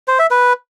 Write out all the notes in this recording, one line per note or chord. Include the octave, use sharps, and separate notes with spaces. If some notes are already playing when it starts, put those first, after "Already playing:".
C5
E5
B4